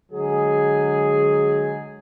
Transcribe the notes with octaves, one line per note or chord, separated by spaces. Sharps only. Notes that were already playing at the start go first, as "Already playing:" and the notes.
D3 F#3 G#3 G#4